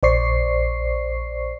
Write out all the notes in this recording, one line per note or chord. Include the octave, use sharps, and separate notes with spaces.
A#1 C5 D5 C#6 C7